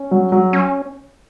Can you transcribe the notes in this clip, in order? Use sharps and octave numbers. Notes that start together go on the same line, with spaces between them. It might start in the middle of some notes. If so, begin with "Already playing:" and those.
Already playing: C#4
F#3
F#3
C#4